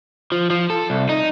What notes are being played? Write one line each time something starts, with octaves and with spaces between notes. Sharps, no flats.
F3
F3
A4
C2
D#4